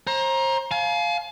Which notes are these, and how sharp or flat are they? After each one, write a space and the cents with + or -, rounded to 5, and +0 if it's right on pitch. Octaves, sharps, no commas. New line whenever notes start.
C5 +35 A#5 +15
F5 +0 G#5 +40